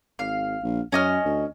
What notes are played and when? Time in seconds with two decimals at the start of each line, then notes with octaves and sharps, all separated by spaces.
0.19 G#1 F5
0.63 A#1
0.92 F#2 C#4 D#5 F6
1.25 D2